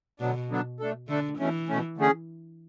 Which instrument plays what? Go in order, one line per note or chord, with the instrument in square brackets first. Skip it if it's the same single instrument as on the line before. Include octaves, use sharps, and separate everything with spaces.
[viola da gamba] B2 [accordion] D3 F#3 B3 D4
[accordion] D3 F#3 B3 D4
A3 D4 A4
[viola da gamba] D3 [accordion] A3 D4 A4
[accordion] B2 A3 C#4 [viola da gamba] E3
[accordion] B2 A3 C#4
D3 A3 C#4 G#4